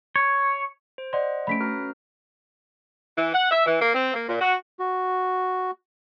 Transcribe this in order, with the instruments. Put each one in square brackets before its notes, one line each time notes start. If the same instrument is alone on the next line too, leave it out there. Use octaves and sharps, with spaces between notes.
[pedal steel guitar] C#5
[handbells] C5
[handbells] C5 D#5 F#5 [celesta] D5 C6
[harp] A3 C#4 [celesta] B5 B6 D7
[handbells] F#4 B4 F6 [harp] A#5
[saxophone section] E3
F#5
E5
E3
A#3
C4
A#3
A#2
F#4
[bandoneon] F#4